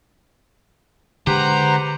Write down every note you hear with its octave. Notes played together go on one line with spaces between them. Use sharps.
D3 G#3 G4 B4 C5 F#5 A#5